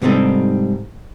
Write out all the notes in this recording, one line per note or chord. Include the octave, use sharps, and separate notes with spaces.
G#2 C3 G3 C4 D#4 A4